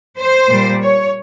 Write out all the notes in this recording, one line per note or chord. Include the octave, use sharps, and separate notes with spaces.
C5
A#2 G3
C#5